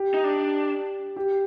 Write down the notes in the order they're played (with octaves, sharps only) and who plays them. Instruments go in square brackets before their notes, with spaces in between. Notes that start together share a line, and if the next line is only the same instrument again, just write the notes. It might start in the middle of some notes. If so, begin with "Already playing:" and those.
Already playing: [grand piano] G4
[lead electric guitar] D#4
D4
[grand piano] G4